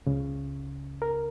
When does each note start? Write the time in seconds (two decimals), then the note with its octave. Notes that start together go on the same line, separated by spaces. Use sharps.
0.06 C#2 C#3
1.02 A#4